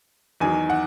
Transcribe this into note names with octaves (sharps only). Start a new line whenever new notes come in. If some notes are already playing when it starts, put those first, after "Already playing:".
E2 D#3 F#3 G#5
F#5